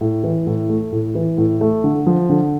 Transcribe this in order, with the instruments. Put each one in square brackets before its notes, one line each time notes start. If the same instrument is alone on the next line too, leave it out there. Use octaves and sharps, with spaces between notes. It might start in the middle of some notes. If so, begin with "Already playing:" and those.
[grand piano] A2
E3
A2
A3
A2
E3
A2
A3
D3
F3
D3